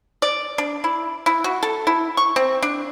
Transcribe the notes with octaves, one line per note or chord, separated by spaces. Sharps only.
D5
D4
E4
E4
F#4
A4
E4
C#6
C4
D4